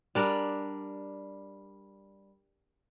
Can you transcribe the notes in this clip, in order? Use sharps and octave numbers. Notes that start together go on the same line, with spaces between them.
G3 D4 A#4